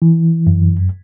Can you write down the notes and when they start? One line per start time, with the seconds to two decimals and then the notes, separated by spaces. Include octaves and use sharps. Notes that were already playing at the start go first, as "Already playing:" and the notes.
0.02 E3
0.47 F#2